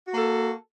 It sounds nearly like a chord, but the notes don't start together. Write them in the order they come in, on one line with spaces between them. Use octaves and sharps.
F#4 A#3 A4